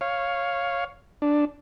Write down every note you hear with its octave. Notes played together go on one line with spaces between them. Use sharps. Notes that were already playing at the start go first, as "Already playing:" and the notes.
C#5 F5
D4